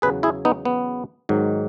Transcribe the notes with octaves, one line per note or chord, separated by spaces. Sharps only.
E2 C#3 F#3 G#4 B4
E4 G#4
B3 D#4
B3
G#2 D#3 F#3